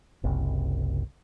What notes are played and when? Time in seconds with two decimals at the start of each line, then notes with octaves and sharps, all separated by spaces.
0.24 F#1 C2